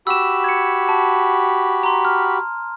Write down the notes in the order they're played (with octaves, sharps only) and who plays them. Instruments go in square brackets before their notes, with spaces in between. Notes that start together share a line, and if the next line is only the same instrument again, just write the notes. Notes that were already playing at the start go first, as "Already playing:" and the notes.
[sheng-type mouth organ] F#4 G4 B5 [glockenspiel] E6 E7
[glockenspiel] G#6 C#7
A5
A#5 C6
F6